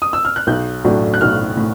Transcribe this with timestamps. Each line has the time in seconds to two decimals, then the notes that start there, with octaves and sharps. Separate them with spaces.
0.02 D#6
0.13 E6
0.25 F6
0.36 F#6
0.47 B1 G6
0.85 A2 F#3 A3 D4
1.14 F#6
1.21 B1 F6
1.57 A2